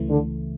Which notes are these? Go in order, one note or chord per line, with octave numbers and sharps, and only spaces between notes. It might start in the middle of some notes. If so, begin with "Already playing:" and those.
Already playing: C#2 C#3 E3 A3
D3